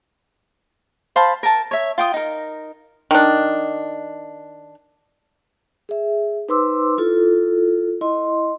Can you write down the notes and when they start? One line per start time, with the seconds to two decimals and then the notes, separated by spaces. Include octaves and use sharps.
1.16 C5 F5 A5 B5
1.43 A#4 A5
1.71 C#5 E5
1.98 F4 G5 D#6
2.14 D#4 A#4
3.11 D#3 D4
5.89 G#4 E5
6.49 D#4 B4 C5 C6 D6 E6
6.98 E4 F4 A4
8.01 E4 D#5 C6